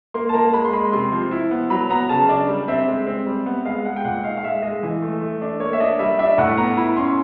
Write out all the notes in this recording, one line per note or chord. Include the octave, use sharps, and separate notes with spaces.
A#3 C6
A5
A#3 A#5
G#3 B5
C6
G#3 B5
C3 C6
F3
E4
B3
F#3 B5
B3 A#5
C#3 A5
D4
G3
C4 E5
G#3
C4
G3
B3
G#3 F5
G#3 F#5
G5
A#2 F#5
D#4 F5
F5
G#3 E5
G#3 D#5
E3
A3
A3
D4
A#3 C#5
E5
D4 D#5
G3 E5
D4 E5
A2 F#5
B3 A#5
E4 B5
C#4 C6